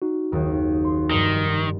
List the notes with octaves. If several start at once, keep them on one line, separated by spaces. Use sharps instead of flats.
D#4 F#4
F#1 D#2
C6
F1 G2 D#3